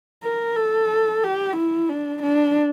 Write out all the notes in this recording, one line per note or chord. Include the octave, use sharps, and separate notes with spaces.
A#4
A4
G4
E4
D4
D4